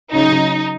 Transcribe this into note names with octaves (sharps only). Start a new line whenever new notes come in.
C#3 F#3 D#4